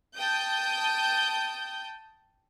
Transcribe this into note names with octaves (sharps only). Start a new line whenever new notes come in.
G5 A5 D#6 G6